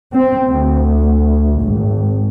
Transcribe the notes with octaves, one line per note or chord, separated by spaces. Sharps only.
C4
D2
G#1